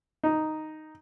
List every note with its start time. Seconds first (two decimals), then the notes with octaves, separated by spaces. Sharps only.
0.24 D#4